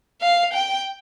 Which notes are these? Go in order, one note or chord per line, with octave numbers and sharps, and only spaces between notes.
F5
G5